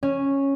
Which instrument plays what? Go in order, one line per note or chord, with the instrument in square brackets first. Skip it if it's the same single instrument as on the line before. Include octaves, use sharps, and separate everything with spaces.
[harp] C#4